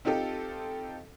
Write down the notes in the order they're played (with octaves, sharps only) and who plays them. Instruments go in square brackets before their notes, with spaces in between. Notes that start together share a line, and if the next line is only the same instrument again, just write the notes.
[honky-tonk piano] C4 D#4 F4 G4 A4